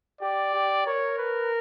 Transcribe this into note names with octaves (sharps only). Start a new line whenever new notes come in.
G4 D5
G4
A#4 C#5
B4